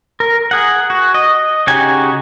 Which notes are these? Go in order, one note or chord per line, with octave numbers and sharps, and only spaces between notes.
A#4
G#4 F#5
F#4
D#5
C#3 D#4 F#4 G4 G#5